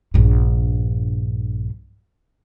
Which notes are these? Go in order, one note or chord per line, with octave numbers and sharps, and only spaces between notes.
A#1 G2